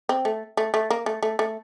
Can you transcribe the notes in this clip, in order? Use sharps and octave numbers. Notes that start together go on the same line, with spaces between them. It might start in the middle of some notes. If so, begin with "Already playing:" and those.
C4
A3
A3
A3
A#3
A3
A3
A3